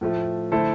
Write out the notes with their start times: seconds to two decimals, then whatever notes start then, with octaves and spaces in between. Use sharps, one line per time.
0.01 A2 F3 A3
0.52 D3 A3 E4 A4 C5